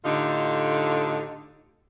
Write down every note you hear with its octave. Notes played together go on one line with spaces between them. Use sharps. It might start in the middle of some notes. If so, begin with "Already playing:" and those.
A2 D3 D#4 F4 G4 A4